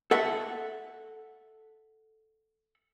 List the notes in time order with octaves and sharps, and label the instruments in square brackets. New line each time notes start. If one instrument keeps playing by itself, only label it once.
[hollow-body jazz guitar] A4 E5 F#5